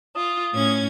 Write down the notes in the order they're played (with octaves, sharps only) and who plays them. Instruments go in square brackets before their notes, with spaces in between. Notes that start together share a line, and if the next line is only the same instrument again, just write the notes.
[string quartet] F4 [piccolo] D#6
[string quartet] A2 C#4 G#6